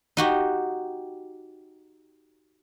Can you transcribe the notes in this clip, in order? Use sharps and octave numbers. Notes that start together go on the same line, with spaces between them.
D#4 F#4 G4